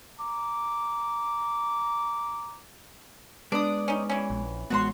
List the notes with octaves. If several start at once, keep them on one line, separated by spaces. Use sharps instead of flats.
A#5 D6
G#3 B3 D4 D5 D#6
C#4 D#4
E3 C#4
A#1
A1 G#3 B3 F#4 C#5 C6